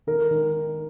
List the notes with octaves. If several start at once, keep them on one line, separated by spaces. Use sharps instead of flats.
D#3 A#4
D#3